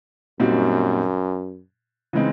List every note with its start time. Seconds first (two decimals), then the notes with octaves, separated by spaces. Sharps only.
0.40 F#2 A#2 G3 C4 D#4 F#4
2.13 C#3 E3 G#3 C4 D#4